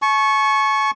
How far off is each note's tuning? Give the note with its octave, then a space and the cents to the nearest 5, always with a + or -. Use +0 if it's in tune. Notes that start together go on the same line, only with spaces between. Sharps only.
A5 -45 C#6 -5